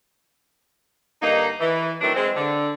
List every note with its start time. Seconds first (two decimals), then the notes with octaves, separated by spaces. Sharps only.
1.22 G2 D3 A#3 D#4
1.60 E3
2.01 D#3 E3 F#3 A3 D4
2.15 G#3 C4
2.36 D3